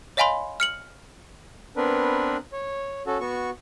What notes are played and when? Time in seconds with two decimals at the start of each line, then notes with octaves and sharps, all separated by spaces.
0.17 C#5 D#5 F5 G#5 B5 C6
0.60 F6 C#7 F#7
1.77 B3 C4 D4 A#4 B4
2.53 C#5
3.07 C#4 F#4 A4
3.20 B3 F#4 C#6